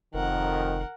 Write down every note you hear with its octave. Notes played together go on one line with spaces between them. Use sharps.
F1 F2 D#3 A#4 F#5